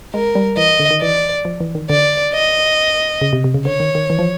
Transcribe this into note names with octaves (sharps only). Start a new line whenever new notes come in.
G#3 A#4
G3
E3 D#5
D3
D#3
E3 D5
F3
E3
D#3
D3 D5
D#5
C#3
C3
C3
C#3
D3 C#5
D#3
D#3
E3
F3